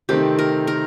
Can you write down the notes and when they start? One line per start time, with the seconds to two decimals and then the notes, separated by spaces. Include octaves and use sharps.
0.09 C3 D#3 A3 C4 G4
0.39 A#4
0.67 A#4